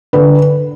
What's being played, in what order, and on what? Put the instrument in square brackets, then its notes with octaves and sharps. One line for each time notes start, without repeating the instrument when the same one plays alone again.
[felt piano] D3 B4